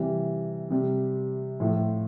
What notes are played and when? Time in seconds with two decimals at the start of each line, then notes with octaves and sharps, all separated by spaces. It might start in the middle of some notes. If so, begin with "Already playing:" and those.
Already playing: C3 E3 G3
0.70 C3 G3
1.60 A2 F3